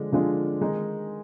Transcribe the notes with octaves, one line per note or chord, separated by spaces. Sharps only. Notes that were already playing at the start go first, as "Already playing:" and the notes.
Already playing: D3 F3 G#3 D4 F4
D3 F3 G#3 D4 F4
D#3 G#3 D#4